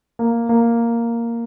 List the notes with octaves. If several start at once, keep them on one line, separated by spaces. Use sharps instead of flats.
A#3
A#3